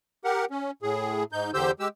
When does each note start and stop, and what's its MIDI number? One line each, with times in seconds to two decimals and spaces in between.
0.24 0.45 67
0.24 0.45 70
0.24 0.45 78
0.51 0.71 61
0.82 1.24 45
0.82 1.24 68
1.32 1.51 44
1.32 1.51 63
1.32 1.51 91
1.54 1.71 40
1.54 1.71 50
1.54 1.71 67
1.54 1.71 72
1.54 1.71 88
1.54 1.71 91
1.80 1.88 56
1.80 1.88 67
1.80 1.88 88